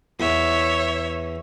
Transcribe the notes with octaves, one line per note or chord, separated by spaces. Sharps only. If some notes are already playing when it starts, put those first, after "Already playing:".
E2 C#5 E5